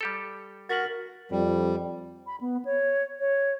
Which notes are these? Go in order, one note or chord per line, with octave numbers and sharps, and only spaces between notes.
G3 G4 A4
F#4 A#4 A6 B6 F#7
F2 G3
B5
B3
C#5
C#5